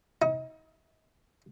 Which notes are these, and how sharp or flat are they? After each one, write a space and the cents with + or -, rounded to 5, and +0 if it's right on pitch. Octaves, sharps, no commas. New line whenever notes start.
D#4 +35